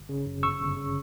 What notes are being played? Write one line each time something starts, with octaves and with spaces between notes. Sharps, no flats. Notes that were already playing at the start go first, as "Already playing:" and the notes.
Already playing: G1
C#3
F#2
G1 C#6 E6
G1
C#3